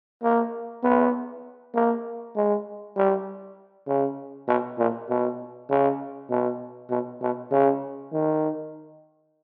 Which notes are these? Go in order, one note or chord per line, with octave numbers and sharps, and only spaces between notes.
A#3
B3
A#3
G#3
G3
C#3
B2
A#2
B2
C#3
B2
B2
B2
C#3
D#3